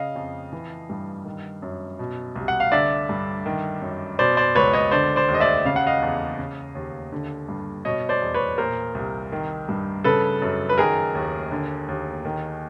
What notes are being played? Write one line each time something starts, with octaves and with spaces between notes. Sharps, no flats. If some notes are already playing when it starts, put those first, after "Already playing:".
Already playing: C#3 D#5 F5
F2
E3
G2
D#3
F#2
B2
C2
F#5
F5
D3 D5 E5
G2
D#3
F#2
B2 C5 D5
C5 D5
C#2 B4 C#5
C#5 D#5
D3 C5 D5
C5 D5
D#2
D#5
D5 E5
C#3 F5
F#5
D#5 F5
E2
C#3
D#2
D3
G2
B2 C#5 D#5
C5 D5
E2
B4 C#5
A#2 A#4 C5
C2
D#3
G2
C#3 A4 B4
F#2
B4
D#3 G#4 A#4
D#2
D3
D#2
D#3